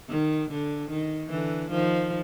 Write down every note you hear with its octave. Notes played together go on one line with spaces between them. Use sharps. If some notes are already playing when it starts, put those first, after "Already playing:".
D#3
D3
D#3
D3 E3
D#3 F3